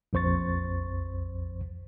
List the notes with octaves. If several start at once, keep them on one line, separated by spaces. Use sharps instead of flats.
A#1 F2 C5 C#6 A6